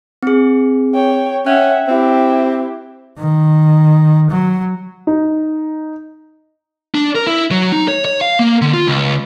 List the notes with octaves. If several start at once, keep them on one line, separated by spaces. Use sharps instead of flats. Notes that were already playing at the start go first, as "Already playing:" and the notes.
C4 G#4
C#5 G5
C#4 E5 F#5 G5 F#6
C4 E4 G4
D#3
F#3
D#4
D4
A#4
E4
F#3
D#4
C#5
C#5
F5
A#3
D3
F4
C#2